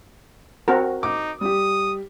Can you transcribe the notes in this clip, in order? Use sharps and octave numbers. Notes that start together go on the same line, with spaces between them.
C4 F#4 A#4
D#4 D6
G3 G4 D#6